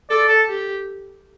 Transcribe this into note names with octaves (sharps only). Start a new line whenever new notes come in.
A4 D5
A4
G4